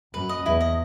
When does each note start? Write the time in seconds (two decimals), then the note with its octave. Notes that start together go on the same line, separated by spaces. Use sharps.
0.14 F#2 B4
0.29 D#5
0.46 E2 E4
0.61 D#5